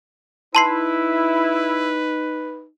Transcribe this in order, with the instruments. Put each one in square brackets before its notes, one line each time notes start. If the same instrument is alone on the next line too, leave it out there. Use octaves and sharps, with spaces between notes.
[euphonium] D#4 [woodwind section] E4 [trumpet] B4 [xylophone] A5 C6 C7